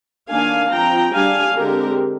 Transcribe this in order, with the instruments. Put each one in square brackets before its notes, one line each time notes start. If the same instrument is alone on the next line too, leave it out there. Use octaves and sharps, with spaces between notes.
[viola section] D#3 A#3 D4 F5 G#5
F3 C4 G5 A#5
G3 D4 F5 G#5
D3 G#3 C4 G4 A#4